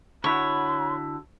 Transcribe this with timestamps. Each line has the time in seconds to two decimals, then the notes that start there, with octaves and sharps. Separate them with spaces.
0.24 D3 E4 F#4 C#5 B5